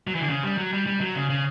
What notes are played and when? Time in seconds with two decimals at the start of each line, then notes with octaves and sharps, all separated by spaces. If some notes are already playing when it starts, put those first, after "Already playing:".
0.07 F#3
0.15 E3
0.21 D3
0.29 C#3
0.44 G3
0.57 F#3
0.73 G3
0.87 G3
1.01 F#3
1.15 C#3
1.30 C#3